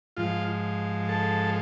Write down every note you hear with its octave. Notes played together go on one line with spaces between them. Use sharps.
G#2 F3 F4
A4